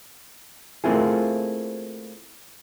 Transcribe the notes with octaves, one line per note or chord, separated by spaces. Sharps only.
A3 A#3 C4 E4 F4 G#4